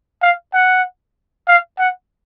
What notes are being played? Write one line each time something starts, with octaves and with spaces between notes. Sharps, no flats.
F5
F#5
F5
F#5